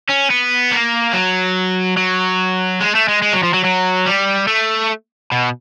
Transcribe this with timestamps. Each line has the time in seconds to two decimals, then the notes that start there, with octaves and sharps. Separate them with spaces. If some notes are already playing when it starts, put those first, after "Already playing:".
0.09 C#4
0.30 B3
0.72 A#3
1.13 F#3
1.97 F#3
2.80 G#3
2.95 A3
3.08 G#3
3.22 G#3
3.33 F#3
3.43 F3
3.54 F#3
3.64 F#3
4.06 G3
4.48 A3
5.32 B2